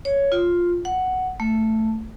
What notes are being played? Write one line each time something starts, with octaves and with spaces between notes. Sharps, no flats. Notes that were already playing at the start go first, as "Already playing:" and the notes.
C#5
F4
F#5
A3